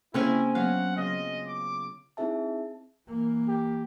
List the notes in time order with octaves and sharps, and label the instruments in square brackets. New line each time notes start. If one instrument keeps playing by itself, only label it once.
[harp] C#3 A#3 [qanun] C4 C#4 G#5 [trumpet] E4
[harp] F#3 B3 C#4 [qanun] F5 [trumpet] F#5
[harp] C#3 F4 [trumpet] D#5
[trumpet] D6
[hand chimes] C4 D#4 E4 G#4 E5 A5
[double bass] E3 A#3
[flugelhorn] G4